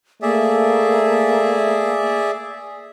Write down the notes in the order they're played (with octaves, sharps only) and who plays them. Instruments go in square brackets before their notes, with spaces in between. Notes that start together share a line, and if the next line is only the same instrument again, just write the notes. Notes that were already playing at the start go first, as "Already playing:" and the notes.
[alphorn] A3 [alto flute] A#3 [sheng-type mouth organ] G#4 D5 E5